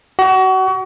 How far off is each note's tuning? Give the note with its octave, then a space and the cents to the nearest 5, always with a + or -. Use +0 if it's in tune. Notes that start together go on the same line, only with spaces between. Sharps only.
F#4 +30